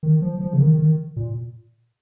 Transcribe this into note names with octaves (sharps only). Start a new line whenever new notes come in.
D#3
F3
F3
C#3
D#3
D#3
A#2